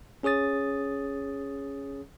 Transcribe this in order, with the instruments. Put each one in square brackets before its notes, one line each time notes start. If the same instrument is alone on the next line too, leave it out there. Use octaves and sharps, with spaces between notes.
[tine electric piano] C#4 G#4 C#5 D#6 A6